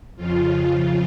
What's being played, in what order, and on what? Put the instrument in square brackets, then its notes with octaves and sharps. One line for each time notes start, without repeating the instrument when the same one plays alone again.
[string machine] F2 C#3 F3 F4